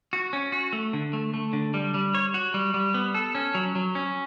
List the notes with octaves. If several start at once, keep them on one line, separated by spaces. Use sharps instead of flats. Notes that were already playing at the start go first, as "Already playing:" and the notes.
F#4
C#4
F#4
A3
D3
A3
A3
D3
G3
G3
C#5
F#4
G3
G3
B3
A4
C#4
F#3
F#3
C#4